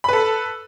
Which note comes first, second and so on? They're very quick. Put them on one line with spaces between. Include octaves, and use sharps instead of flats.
B5 B4 A4